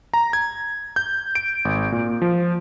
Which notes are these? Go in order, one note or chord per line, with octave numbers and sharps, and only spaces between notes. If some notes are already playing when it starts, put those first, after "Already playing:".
A#5
G#6
G6
D7
G#1
A#2
F3